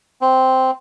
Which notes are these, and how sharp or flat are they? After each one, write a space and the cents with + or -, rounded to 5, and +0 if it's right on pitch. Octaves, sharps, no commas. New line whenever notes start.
C4 -5